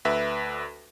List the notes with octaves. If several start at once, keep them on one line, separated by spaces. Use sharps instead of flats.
D2 B4 E5